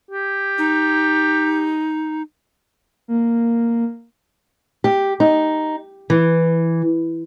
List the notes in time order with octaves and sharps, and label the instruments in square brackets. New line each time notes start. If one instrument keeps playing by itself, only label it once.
[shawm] G4
[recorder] D#4
[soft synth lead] A#3
[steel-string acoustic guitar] G4
D#4
E3